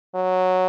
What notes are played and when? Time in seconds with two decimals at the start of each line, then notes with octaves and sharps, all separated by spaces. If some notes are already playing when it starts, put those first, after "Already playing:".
0.15 F#3